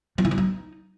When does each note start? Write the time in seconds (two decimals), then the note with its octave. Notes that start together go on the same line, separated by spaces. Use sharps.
0.18 F3
0.25 E3
0.31 F#3
0.38 D#4